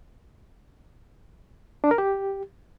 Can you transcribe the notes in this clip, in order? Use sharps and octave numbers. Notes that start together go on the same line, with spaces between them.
D4
A#4
G4